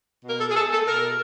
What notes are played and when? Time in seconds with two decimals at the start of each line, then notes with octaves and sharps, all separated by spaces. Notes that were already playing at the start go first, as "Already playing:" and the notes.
0.23 B2
0.29 A#4
0.40 A4
0.50 G#4
0.56 A4
0.72 A4
0.88 B2 A#4